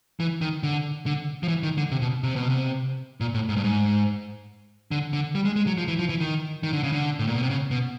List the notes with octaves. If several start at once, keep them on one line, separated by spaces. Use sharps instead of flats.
E3
D#3
D3
D3
F3
E3
D#3
D3
C3
B2
C3
B2
C3
A#2
A2
G#2
G2
G#2
D3
D3
G3
G#3
G#3
F#3
F3
E3
F3
E3
D#3
D#3
D3
C#3
D3
A2
A#2
B2
C3
C#3
B2